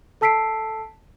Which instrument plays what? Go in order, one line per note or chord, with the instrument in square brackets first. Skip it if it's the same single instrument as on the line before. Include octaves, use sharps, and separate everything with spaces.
[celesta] A4 A5 E6 B6 C7 D7